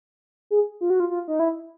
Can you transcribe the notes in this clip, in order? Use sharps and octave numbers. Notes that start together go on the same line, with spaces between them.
G#4
F4
F#4
F4
F4
D#4
E4